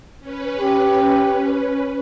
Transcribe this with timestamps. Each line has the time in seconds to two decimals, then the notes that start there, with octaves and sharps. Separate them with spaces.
0.20 C#4 B4
0.59 G4